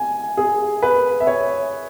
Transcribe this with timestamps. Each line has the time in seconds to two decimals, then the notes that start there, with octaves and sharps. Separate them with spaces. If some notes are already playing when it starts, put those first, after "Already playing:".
Already playing: G#5
0.37 G#4
0.83 B4
1.20 E5
1.27 C#5